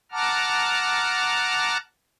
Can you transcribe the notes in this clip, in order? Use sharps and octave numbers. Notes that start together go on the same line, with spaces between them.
F#5 A5 A#5 D6 F6